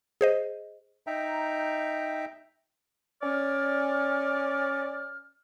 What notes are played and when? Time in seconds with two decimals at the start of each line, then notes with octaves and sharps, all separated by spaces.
0.21 G#4 C5 D#5
1.07 D#4 E5 G5 A#5
3.23 C#4 D5 F6